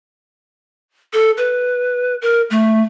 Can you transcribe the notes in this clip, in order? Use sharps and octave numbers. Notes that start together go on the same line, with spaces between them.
A4
B4
A#4
A3